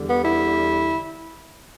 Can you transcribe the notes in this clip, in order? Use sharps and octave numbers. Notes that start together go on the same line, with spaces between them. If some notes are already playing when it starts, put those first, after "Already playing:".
Already playing: E2 D3 G3
B3
E4